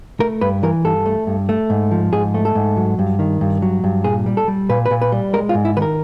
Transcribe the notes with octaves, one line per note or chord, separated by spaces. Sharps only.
A3 A#4
G2 B4
E3 A#4
G2 A4
A3
G2
A3
G#2
F3
G#2 G#4
A3
A4
G#2
F#3
G2
D#3
G2
F#3
G2
A#2 G#4
G3
A4
G3
A#2 B4
B4
A#2
B4
G3
G#3 A#4
F4
G#2
E4
D#3 B4
A#4